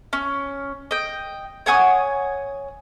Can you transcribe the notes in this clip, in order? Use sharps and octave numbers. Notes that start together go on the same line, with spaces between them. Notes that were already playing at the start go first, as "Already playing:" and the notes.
C#4
D#5 G5
C#5 F#5 G#5 D#6